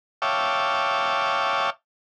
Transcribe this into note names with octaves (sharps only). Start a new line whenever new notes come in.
C#5 E5 F5 G5 A5 D6